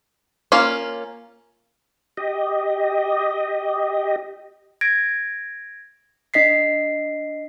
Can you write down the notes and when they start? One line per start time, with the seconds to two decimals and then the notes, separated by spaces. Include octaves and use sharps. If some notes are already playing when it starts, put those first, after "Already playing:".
0.52 A#3 C#4 F4
2.17 G4 D#5
4.81 G#6 A#6 D7
6.34 D4 D#5 B6 C7